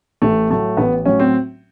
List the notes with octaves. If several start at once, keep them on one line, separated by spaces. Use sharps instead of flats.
A1 A3
A2 F#3 A3
A1 B3
A2 F#3 C#4
C4